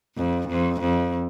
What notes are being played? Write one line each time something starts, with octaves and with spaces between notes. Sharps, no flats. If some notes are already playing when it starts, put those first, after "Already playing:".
F2
F2
F2